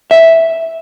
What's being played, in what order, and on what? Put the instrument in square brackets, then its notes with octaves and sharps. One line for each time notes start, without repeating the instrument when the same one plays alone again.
[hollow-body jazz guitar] E5